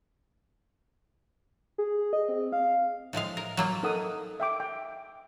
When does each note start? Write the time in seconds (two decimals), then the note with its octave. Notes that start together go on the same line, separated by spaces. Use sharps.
1.78 G#4
2.13 D#5
2.29 C4
2.52 F5
3.13 A2 F3 G#3 F5
3.37 A#4
3.57 F#3 A#3 F4
3.83 D#4 A4 A#4 F#5 D#6
4.40 E5 G5 D6
4.60 G5